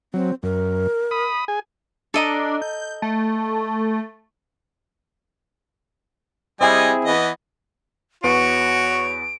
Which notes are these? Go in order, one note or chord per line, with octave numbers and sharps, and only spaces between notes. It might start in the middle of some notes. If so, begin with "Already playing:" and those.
F#3 C4
F#2 A#4
B5 D#6
G#4 G#5
D4 A4 D#5 A#5
G6
A3
G3 C4 E4 G#4 D#5 G#5
E3 B3 D#5
E2 B3 F#4 B4 C#5 D7